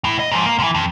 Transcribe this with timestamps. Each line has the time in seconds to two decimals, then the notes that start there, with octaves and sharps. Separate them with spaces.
0.04 A2 E4
0.19 D#5
0.32 G#2 F3
0.46 A#3
0.60 D3 E3
0.75 F2